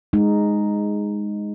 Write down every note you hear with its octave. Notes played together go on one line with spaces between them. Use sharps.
G#3 D#4